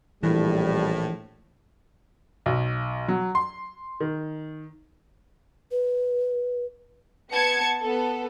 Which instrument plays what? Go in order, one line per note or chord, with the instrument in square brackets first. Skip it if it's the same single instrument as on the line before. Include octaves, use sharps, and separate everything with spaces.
[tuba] A#1 [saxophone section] A2 [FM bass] E3 [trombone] G3
[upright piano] B1
F#3
C6
D#3
[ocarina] B4
[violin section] B3 A5 G#6 C#7
B3 A4